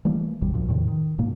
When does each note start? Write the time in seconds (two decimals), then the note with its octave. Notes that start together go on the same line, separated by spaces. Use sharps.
0.05 E3 G3 A3 A#3
0.42 G#1 D#2 B2 G3
0.54 D2 A#2 F3
0.68 E2 A2 C3 D#3
0.88 D#3
1.18 G#2 B2 A#3